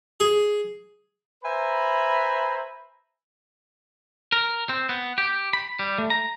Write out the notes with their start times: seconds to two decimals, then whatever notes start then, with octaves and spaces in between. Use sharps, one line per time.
0.20 G#4
1.44 B4 C5 E5 G#5 A#5 B5
4.32 A#4
4.69 C4
4.89 B3
5.18 G4
5.53 B5
5.79 G3
5.98 A3
6.10 A#5